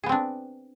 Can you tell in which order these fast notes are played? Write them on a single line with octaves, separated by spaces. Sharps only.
G#4 B3 C4 D4